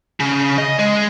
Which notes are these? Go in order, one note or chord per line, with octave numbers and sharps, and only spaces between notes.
C#3
D#5
G#3